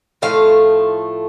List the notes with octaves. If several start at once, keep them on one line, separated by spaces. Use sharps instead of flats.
A2 F3 A3 F5